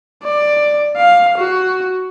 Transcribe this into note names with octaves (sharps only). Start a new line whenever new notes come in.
D5
F5
F#4